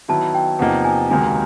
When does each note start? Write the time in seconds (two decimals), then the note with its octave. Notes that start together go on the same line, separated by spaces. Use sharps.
0.08 D#3 F#3 B3 E4 A5
0.34 G5
0.59 E2 C3 F3 A#3 D#4 F#5
0.84 G#5
1.10 C#2 C3 D#3 F#3 A#3 G#5